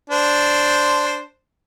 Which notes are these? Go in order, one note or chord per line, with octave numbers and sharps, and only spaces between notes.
D4 C5